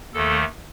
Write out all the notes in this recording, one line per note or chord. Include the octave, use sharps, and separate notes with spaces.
D#2 D#3 A3 A4